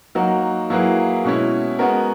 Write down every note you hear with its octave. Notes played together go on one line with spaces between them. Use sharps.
F#3 A#3 D#4 F#4 A#4
F#3 A#3 E4 G#4 B4
B2 G#3 C#4 E4
G#3 B3 F#4 A#4